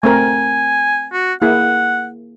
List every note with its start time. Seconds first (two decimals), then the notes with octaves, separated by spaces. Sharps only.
0.03 A3 C4 A#4 G#5
1.13 F#4
1.42 A#3 E4 G#4 F#5